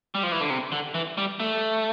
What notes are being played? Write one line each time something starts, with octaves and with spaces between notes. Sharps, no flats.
G3
F3
E3
D3
C3
D3
E3
G3
A3